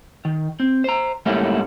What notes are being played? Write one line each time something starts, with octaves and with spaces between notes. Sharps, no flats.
D#3
C4
C5 A#5
G#2 G3 A3 A#3 C#4 E4